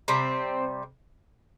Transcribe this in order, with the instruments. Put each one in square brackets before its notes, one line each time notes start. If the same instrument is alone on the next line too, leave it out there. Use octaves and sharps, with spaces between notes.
[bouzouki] C3 G3 C4